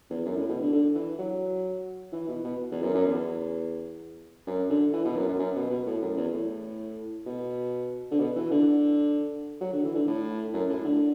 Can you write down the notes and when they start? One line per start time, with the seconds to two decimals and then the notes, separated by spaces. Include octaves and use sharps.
0.10 E2
0.25 F#2
0.36 A2
0.49 B2
0.60 D3
0.73 D3
0.95 E3
1.19 F#3
2.12 E3
2.28 B2
2.44 B2
2.71 E2
2.82 F#2
2.94 F#2
3.06 E2
4.46 F#2
4.69 D3
4.93 E3
5.05 B2
5.16 F#2
5.28 F#2
5.39 F#2
5.55 B2
5.70 B2
5.86 A2
6.02 F#2
6.17 E2
6.33 A2
7.26 B2
8.11 D3
8.19 B2
8.36 E3
8.51 D3
9.61 F#3
9.72 D3
9.83 E3
9.95 D3
10.07 A2
10.53 F#2
10.69 A2
10.85 D3